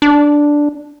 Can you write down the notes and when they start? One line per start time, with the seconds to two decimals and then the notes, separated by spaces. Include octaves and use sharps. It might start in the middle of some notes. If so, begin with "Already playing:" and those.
0.02 D4